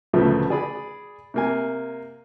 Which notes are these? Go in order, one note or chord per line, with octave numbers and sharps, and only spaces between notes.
D2 A#2 C#3 F3 A3 B3
G#4 D5 B5 D#6
C3 A#3 G#5